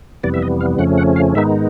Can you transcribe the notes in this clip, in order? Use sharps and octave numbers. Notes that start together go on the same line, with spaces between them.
F2 C3 E3 G3 B3 D5
E5
D#5
F5
F2 C#3 F3 A3 C#4 F#5
F#5
F5
G#2 D#3 G#3 B3 D#4 E5